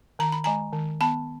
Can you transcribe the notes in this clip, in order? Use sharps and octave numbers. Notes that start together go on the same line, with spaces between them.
D#3 A#5
B5
G#3 G#5 A#5
D#3
B3 A5 B5